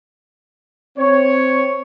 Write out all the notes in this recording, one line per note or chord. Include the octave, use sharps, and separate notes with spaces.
C4 C#5